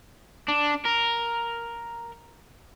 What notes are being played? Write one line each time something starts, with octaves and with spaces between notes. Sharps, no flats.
D4
A#4